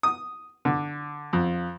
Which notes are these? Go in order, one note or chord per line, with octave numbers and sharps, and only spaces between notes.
D#6
D3
F2